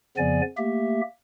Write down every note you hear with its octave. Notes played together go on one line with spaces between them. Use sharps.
F2 C#3 F3 B3 D5 G#5
A3 A#3 G4 E5